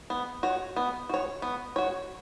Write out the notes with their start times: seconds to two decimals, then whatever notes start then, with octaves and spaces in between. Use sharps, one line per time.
0.10 B3
0.43 F#4 C#5
0.76 B3
1.09 F#4 C#5
1.42 B3
1.76 F#4 C#5